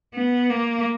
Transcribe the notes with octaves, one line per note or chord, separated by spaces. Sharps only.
B3
A#3